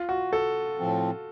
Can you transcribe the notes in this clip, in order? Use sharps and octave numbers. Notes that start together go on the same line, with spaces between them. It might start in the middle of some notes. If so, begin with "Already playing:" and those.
Already playing: F4
F#4
A4
A2 F3 C4